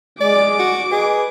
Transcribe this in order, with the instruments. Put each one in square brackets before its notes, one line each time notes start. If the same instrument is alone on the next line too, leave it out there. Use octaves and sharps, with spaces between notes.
[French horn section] G#3 [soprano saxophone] D5 [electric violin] D6
[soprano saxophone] F#4
[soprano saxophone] G#4 [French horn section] B4 D#5